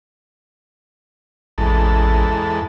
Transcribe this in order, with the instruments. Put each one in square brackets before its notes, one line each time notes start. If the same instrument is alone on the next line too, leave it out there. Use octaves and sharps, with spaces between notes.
[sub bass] A1 [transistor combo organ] E2 G#2 A4